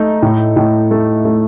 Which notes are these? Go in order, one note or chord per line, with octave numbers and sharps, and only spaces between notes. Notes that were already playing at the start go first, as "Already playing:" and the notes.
Already playing: A3 D#4
A2
A2
A3
A3